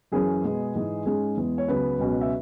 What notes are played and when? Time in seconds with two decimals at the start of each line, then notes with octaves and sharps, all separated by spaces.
0.12 F#2 E3 C#4 G#4
0.44 B2 G#3 B3
0.75 G#2 E3 G#3
1.06 G#2 G#3 C#4 G#4
1.37 E2 E3 G#3 B3
1.58 C#5
1.68 C#2 C#3 F#3 B3 B4
1.99 C#2 B2 F#3 C#4
2.21 E5